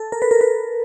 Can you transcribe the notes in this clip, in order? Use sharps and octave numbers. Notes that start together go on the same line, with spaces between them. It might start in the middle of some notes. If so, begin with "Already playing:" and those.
Already playing: A4
A#4
B4
A#4
B4